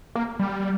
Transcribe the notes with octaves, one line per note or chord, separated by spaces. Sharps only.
A#3
G3